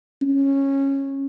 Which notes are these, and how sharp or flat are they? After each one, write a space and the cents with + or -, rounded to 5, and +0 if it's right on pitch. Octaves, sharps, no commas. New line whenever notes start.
C#4 -10